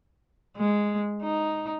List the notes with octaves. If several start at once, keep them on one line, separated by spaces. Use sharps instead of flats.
G#3
D#4